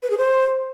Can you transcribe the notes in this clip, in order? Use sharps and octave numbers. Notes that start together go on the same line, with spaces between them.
B4
G#4
C5